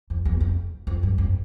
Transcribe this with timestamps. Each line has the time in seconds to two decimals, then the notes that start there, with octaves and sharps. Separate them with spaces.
0.10 F2
0.25 E2
0.40 F2
0.87 F2
1.03 G2
1.18 F2